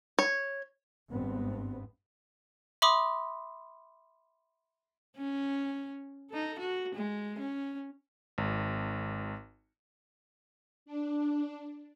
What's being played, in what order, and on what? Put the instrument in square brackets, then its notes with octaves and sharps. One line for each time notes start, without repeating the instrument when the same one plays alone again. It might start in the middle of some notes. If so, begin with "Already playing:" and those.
[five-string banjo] C#5
[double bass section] G#1 G2 B3 C4
[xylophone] E5 B5 C6 D6 D#6
[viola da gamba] C#4
D#4 A4
F#4
G#3
C#4
[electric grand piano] G#1
[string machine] D4